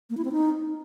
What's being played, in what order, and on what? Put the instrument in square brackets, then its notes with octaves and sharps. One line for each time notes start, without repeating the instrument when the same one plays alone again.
[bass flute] A#3
E4
C4
D#4